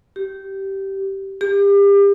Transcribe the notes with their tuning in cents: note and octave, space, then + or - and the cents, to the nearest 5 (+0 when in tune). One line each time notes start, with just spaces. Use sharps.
G4 -15
G4 +35